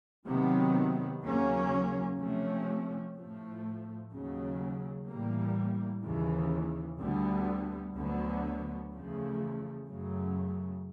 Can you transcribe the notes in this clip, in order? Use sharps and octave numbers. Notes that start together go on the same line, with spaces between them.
C3 D#3 F#3 B3
D#2 C#3 F#3 A#3 C#4
C3 F3 A3 C#4
A2 F3 A3
D#2 C#3 F#3
A2 E3 G3 A#3
D#2 C#3 E3
D2 D3 G3 B3
D2 D3 F#3 B3
E2 C#3 F3 A3
F#2 C#3 F#3 A3